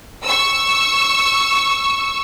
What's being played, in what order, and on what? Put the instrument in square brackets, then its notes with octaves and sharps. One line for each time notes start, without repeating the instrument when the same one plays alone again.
[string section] C#6 E6